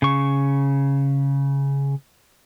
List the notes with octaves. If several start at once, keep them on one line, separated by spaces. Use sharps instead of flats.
C#3 C#6